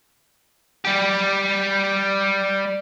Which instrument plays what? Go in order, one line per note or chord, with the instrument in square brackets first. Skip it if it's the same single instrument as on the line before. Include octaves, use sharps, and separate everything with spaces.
[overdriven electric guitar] G3 G4